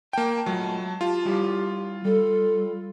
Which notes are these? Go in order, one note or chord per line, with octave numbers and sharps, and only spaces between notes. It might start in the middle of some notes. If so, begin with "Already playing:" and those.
A#3 G5 A5
F#3 G#3 A3 F4
F4 G4
G3 E4 G4 F5
G3 A4